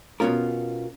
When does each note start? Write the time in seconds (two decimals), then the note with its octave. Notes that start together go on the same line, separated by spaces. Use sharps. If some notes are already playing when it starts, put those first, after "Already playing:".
0.20 B2 B3 C#4 F4 A#4